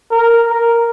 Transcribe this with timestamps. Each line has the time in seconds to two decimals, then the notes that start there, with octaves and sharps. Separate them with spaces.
0.11 A#4
0.51 A#4